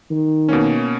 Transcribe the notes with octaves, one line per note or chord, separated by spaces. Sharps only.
D#3
B2 A#3 C#4